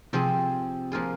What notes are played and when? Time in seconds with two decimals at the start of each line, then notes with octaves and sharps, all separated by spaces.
0.13 C3 F3 C4 G#4
0.92 F3 A#3 F4 G#4